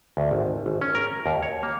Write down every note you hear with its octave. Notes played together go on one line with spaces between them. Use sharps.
D2
G#1
G#1
C#4
A#4
D#2
C#5
A#3